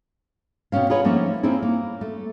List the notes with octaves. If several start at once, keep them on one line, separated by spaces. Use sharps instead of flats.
B2 F3 C4 C#4 F5
F4 G#4 A#4 B4 C#5 F#5
F3 A3 A#3 C4 C#4 D#4
A#3 C4 C#4 D#4 E4 G#4
A#3
A3